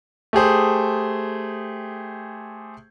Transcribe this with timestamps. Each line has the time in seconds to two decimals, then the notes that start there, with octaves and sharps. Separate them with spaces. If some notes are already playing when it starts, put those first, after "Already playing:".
0.33 A3 G4 G#4 C5